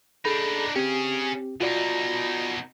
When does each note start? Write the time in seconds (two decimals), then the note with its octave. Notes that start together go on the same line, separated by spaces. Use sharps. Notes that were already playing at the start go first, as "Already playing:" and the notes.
0.25 D4 D#4 G#4 A4 B5
0.76 C4 C#4 G4 G#4
1.61 B2 D#4 F4 F#4 D5